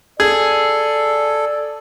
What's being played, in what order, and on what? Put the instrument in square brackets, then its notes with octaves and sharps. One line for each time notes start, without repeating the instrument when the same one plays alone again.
[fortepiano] G#4 [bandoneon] A4 [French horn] D5